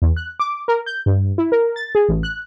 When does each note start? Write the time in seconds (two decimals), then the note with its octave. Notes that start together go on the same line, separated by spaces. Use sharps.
0.02 E2
0.17 F#6
0.40 D6
0.68 A#4
0.86 G6
1.06 G2
1.38 E4
1.52 A#4
1.76 A6
1.95 G#4
2.08 A1
2.23 F#6